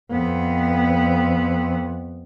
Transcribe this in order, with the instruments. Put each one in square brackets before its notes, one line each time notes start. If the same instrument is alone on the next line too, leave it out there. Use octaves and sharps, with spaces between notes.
[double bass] F2 B3